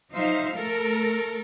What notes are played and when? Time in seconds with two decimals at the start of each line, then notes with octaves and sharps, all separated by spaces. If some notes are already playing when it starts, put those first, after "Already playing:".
0.12 F3 F#3 D#4 C5 E5 F5
0.55 A3 A4 A#4